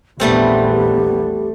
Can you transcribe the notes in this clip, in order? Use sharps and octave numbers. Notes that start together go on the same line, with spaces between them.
A#1 E2 G3 A3 B3 C4 G4